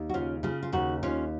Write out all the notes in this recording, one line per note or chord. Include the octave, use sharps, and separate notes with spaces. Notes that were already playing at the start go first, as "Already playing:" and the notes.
Already playing: D#2
F#4
C#3 C#4 F4
C#3 F4 G#4
F4
D#2 D#4 F#4
D#2 C#4 F4